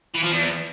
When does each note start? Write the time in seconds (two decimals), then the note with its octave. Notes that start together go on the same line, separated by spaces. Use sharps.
0.15 E3
0.23 F3
0.32 E2